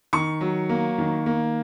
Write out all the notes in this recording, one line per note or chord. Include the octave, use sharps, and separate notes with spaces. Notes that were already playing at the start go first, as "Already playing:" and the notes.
D#3 C#6
F#3
A#3
D#3
A#3